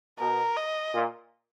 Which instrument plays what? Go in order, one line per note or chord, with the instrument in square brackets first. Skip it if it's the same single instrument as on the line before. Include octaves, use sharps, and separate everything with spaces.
[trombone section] B2 [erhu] A#4
[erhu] D#5
[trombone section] A#2